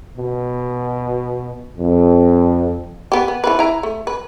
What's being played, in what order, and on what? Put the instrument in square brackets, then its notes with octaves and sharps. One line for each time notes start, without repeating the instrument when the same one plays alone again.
[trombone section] B2
F2
[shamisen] B3 G4
B3
E3 F3 B4
E4 A#5
A3
B4